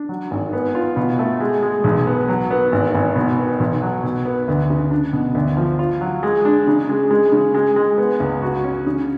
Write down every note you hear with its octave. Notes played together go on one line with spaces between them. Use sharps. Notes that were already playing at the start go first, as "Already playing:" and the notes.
Already playing: D4
F#3
G#1
B3
F4
B2
A3
G#3
G#3
B1
B3
F#3
B3
G#1
G#1
B2
B3
B1
F#3
B2
B3
D2
C#3
D4
B2
D2
F3
F4
F#3
G#3
D4
C#3
G#3
G#3
C#3
G#3
G#3
B3
C#2
F#4
C#4
C#3